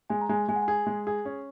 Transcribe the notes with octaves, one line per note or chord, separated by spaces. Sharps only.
G#3 G#5
A#5
G#3 G#5
G#3 G#5
F#5
G#5
G#4
G#3
G#4
C#4